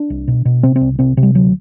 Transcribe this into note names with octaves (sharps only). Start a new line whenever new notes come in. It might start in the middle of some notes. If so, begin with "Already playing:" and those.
Already playing: D4
C2
B2
B2
C3 C4
C4
C2
C3 C4
C3
G3
D2 F#3